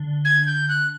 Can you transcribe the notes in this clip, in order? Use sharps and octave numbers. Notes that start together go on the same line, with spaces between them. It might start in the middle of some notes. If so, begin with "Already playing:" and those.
Already playing: D3
G#6
G6
F#6